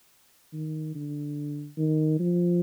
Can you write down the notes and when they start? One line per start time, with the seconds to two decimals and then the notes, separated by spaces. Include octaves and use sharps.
0.53 D#3
0.95 D3
1.77 D#3
2.19 F3